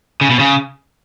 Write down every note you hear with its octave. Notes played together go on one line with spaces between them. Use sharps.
C#3
B2
C#3